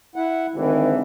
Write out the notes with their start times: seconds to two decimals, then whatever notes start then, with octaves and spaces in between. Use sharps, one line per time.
0.16 E4 F#5
0.55 G#1 D2 D#3 E3